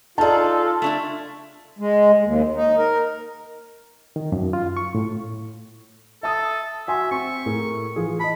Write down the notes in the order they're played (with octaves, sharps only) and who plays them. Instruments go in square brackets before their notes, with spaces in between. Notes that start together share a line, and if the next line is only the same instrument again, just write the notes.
[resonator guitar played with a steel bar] D#4 G#4 [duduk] F4 [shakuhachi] A4 [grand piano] D5 A5
[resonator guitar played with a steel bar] A3 D4 E4
[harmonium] G#3
D#2
D#4
A#4
[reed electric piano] D#3
F#2
F4
C#6
A2
[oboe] A4 [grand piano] E5 A5 D#6
[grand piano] F#4 G#5 C6 [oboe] E5
[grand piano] C4 [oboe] C#6
[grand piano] A2 G#4 A#4
E3 F4 G#4
[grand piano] D#5 A5 [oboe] B5